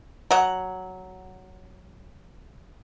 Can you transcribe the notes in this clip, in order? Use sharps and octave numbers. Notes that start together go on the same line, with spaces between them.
F#3 F#5